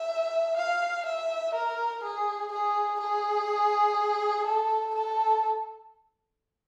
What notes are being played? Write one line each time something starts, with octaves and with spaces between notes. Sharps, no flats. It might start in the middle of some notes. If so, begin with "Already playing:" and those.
Already playing: E5
F5
E5
A#4
G#4
G#4
G#4
A4
A4